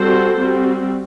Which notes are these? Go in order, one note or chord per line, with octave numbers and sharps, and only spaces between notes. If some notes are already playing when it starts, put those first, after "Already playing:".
Already playing: G3 C4 F#4 A4 C5
G3 C4 F#4